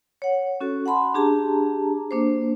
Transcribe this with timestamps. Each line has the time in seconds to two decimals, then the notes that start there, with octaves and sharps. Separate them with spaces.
0.22 C#5 F#5
0.60 C#4 F#4 A4
0.86 F#5 A5 B5 C6
1.14 D4 G4 G#4 A5 A#5
2.11 A#3 D4 C5